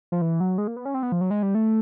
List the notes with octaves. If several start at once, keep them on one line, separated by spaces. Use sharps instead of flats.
F3
E3
F#3
G#3
A#3
B3
C#4
C4
B3
F3
F#3
G#3
G3
A3